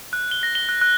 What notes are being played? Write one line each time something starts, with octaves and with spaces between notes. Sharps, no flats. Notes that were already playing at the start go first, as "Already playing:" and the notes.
F#6
G7
A#6
G7
F#6
F#6